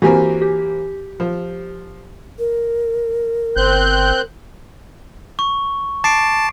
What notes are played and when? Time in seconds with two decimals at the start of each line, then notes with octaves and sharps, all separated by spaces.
0.02 E3 A#3 C4 F#4 G4 G#5
0.42 G4
1.20 F3
2.39 A#4
3.56 G1 C4 F#6 G6
5.39 C#6
6.04 A5 D6 C7 D7